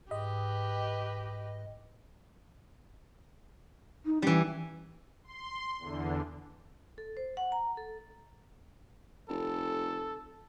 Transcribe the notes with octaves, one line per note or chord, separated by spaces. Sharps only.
G#2 G4 B4 D#5
D#4
E3 G3 C#4
C6
E2 D3
A4
C5
F#5
A#5
A4
F1 A4